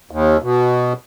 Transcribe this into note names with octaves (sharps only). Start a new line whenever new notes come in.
D#2
B2